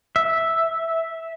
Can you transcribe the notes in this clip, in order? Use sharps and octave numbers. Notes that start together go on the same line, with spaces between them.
E5